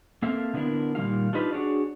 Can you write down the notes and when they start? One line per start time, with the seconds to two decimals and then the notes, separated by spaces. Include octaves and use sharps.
0.22 A#3 C4 A4 E5 F5
0.54 D3 B3 D4 E4 A#4
0.95 A#2 D#3 G3 D#4 F4 F5
1.33 D4 D#4 F4 G4 B4 D#5
1.53 D4 F#4 G#4 C#5 D5